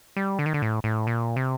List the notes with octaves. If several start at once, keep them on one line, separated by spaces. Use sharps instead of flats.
G3
D3
D#3
D3
A2
A2
A#2
C3